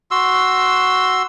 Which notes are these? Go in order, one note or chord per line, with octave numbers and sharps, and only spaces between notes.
F#4 C6 E6